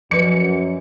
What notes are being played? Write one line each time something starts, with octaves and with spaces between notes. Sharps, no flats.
F#2 F3 B4 C#7